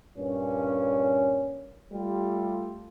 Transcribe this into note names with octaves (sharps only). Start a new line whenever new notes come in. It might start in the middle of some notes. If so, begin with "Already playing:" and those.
G2 A#2 C#4
G3 A3 F4 G4